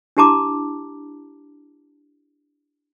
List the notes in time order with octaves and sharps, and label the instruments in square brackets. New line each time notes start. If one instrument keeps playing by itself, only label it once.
[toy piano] D4 E4 G4 A5 A#5 D6